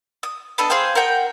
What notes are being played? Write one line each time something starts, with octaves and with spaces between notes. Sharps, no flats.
D#6
B3 D4 A4 D#5
G#4 C5 F5 G5
A#4 F#5 G5